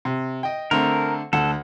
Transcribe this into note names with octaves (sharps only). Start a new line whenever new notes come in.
C3
D#5 G5
D3 A3 C4 A#4
D2 A4 F#5